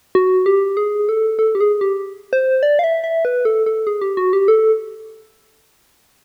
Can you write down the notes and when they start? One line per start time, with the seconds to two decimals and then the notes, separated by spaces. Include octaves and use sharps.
0.15 F#4
0.46 G4
0.77 G#4
1.09 A4
1.39 A4
1.55 G4
1.60 G#4
1.81 G4
2.33 C5
2.63 D5
2.79 F5
2.84 E5
3.04 E5
3.25 B4
3.45 A4
3.66 A4
3.87 G#4
4.01 G4
4.17 F#4
4.33 G4
4.48 A4